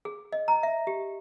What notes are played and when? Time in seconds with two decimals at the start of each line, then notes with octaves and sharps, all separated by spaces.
0.05 G#4
0.32 D#5
0.48 A#5
0.63 E5
0.87 G4